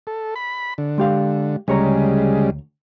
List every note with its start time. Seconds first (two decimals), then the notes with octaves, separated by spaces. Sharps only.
0.07 A4
0.36 B5
0.78 D3
0.98 G#3 G4 F5
1.68 D2 C#3 G3 G#3 C#5 A#5